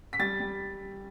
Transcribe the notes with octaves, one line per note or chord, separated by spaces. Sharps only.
B6
G3 A6
G3